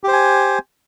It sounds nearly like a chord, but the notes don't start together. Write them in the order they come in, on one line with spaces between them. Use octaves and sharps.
G4 C5 G#5